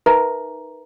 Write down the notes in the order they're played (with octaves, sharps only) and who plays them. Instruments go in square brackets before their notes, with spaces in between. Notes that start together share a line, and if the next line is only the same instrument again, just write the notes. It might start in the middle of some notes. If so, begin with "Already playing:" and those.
[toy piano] D#4 A#4 B4 E5 A#5